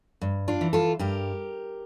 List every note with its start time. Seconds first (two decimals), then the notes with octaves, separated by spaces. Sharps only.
0.21 G2
0.48 D4 F4
0.61 E3
0.73 F4 A4
0.99 G2 G4 A#4